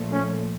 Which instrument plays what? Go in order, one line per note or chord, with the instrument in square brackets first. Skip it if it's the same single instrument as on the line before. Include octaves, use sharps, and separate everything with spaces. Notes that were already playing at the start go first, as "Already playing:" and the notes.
Already playing: [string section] A#2 F3 A3
[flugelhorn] C#4